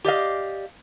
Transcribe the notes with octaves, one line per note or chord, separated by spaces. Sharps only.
G4 D5 D#5 F5